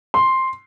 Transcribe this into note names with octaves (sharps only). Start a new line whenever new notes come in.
C6